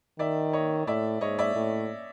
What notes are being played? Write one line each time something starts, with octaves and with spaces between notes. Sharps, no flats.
D#3 D5 E5
C#5 D#5
A2 D5 E5
G#2 C#5 D#5
D5 E5
A2